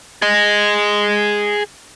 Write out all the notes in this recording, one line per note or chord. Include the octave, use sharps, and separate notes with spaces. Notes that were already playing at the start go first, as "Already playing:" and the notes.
G#4 D#5